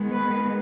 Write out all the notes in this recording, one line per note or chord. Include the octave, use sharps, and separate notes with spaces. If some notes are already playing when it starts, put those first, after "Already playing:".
Already playing: D#3 G#3 B3
B4